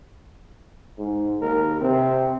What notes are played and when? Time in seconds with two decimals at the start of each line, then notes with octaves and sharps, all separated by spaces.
0.98 G#2
1.42 D#2 A#4
1.81 C3 C4